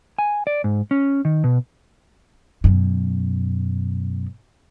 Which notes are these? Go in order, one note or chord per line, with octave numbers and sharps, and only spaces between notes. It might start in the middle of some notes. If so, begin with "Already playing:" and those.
G#5
D5
G#2
C#4
D#3
B2
F#2 B2